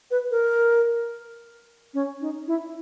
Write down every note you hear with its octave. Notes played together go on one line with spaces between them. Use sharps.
B4
A#4
C#4
D#4
E4